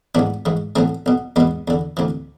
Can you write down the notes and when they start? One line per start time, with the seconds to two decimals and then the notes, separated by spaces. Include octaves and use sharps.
0.15 A1 G#2 E3 B3 D4
0.46 A1 G#2 E3
0.76 B1 A2 E3 A3 C4
1.06 B1 B2
1.36 E2 B2 G#3 B3
1.68 E2 D3
1.97 D2 C3 E3